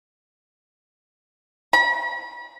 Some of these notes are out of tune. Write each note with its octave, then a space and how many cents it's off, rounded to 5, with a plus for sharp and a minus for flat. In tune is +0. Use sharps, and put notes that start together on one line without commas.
B5 -45